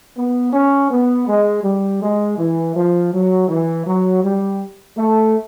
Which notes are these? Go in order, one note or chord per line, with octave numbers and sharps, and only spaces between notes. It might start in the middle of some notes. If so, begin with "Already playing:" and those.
B3
C#4
B3
G#3
G3
G#3
E3
F3
F#3
E3
F#3
G3
A3